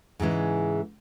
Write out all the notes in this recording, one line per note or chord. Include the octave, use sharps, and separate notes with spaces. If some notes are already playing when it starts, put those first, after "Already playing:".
G#2 C#3 E3 G#3